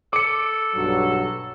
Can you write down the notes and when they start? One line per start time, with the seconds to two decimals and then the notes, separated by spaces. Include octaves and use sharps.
0.13 A4 D6 C#7
0.75 B1 G2 F#3